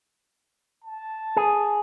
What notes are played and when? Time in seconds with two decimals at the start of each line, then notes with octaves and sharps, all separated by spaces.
0.84 A5
1.36 G#4